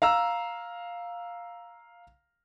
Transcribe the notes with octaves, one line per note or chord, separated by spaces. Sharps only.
F5 A#5 E6